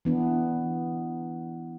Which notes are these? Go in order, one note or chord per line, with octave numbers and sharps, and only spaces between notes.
E3 B3 D4